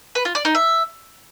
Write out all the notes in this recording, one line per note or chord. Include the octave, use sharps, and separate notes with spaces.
B4
F4
D5
D#4
E5